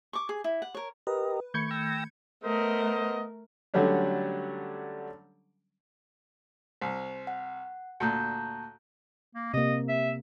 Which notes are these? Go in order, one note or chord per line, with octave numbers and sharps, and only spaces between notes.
C#6 D6
G#4
E4
F#5
A#4 C#5
G4 A#4 B4 D#5
D#3 A3 B5 C#6 G6 G#6 C#7
G5 E6 A#6
A3 B3 A#4 C5 D#5
D3 F#3 G3 A3 C#4 D4
C2 C5
F#5
D2 A#2 A5 A#5 G6
A#3
C3 A#3 D#5
E5